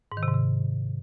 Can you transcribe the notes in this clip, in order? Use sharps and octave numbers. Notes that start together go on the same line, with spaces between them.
G#2
D#3
C3
G#2
C3